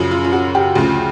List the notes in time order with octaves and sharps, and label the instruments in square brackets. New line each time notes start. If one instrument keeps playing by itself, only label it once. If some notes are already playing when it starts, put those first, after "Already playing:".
Already playing: [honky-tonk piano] F#2 C#3 F3
F4
F4
F#4
G4
D2 C#3 F3